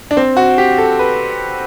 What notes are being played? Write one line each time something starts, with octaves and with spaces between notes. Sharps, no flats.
D4
C4
F#4
G4
A4
B4